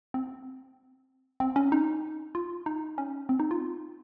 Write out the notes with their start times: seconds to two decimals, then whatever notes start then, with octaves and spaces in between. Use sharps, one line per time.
0.14 C4
1.40 C4
1.56 C#4
1.72 D#4
2.35 F4
2.66 D#4
2.98 C#4
3.29 C4
3.40 D#4
3.51 F4